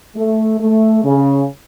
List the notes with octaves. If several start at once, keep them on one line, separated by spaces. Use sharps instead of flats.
A3
A3
C#3